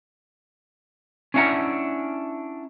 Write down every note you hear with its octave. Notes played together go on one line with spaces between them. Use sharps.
C#4 D4 E4 F5 F#5 A#5